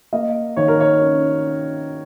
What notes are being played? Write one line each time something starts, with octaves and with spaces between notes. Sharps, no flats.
A#3 D#5
D#3 C#5
A#4
C#5
C#4